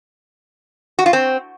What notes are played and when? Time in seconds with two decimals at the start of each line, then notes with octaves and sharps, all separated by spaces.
0.99 F#4
1.06 F4
1.13 C4